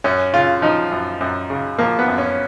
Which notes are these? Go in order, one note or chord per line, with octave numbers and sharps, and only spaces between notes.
F#2 C#4
C#3 F4
F3 D#4
F#2
F#2
C#3
F3 A#3
B3
F#2
C#4